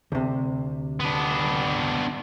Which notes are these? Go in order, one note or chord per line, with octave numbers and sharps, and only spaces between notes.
D2 C3
B3 D4